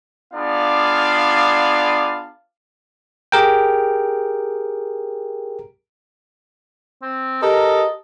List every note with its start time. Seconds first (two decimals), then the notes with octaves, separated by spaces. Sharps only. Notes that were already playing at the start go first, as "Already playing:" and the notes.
0.33 B3 D4 F4 G#4 D5 F5
3.32 G4 G#4 A#4 G5
7.02 C4
7.42 G4 A4 A#4 D#5